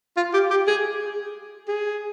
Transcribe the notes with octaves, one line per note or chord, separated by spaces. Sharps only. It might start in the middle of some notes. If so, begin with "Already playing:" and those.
F4
G4
G4
G#4
G#4